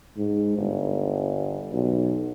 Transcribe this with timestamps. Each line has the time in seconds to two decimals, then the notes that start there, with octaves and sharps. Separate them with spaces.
0.17 G#2
0.58 G1
1.72 B1